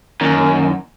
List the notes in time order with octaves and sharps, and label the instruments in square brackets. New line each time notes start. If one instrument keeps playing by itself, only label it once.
[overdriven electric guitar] F#2 [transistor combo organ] D#3 A#3 C#4